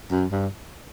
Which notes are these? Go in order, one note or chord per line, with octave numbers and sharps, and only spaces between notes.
F#2
G2